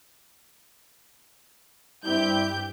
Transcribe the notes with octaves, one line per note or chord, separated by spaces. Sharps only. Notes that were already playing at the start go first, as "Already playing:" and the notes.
G2 G3 C4 E4 G4 G6